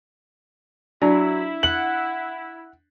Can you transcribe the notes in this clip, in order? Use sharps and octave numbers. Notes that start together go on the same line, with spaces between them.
F#3 D4 E4 D5
F#5 F#7